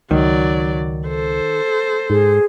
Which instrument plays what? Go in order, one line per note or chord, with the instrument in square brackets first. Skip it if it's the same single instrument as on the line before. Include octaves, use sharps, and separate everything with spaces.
[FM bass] C#2 [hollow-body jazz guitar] D#3 [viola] F#3 D5
[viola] A4 C5
[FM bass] G#2 [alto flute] G#4